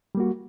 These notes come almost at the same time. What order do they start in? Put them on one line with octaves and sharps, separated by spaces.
G3 A#3 F#4